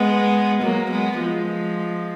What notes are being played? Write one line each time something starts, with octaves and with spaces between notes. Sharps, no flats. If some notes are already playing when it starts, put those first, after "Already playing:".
Already playing: G#3 B3
F#3 A#3
G#3 B3
F3 G#3